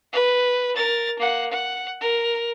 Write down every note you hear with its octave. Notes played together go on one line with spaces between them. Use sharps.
B4
A#4 A6
A#3 F#5
F#5
A#4